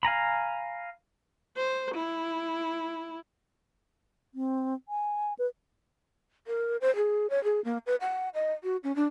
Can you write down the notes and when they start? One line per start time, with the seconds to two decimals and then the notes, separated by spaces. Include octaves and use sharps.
0.03 F5 G#5 A#5 B5
1.57 C5
1.95 E4
4.34 C4
4.89 G#5
5.39 B4
6.47 A#4
6.81 C5
6.96 G#4
7.30 C#5
7.44 G#4
7.65 A#3
7.86 B4
8.01 F#5
8.34 D#5
8.63 F#4
8.84 C#4
8.96 D4